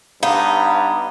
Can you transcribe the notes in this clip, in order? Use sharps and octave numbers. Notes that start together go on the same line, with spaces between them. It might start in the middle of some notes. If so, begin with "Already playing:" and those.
G2 B3 D#4 F5